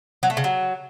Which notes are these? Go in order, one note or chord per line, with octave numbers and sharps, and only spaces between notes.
F#3
A3
C#3
F#3